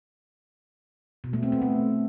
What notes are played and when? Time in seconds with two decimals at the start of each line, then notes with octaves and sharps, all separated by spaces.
1.24 B2
1.33 A3
1.43 C4
1.52 B3
1.62 A3